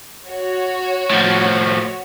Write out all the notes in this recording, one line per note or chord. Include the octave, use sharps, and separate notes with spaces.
F#4 C#5
A2 F3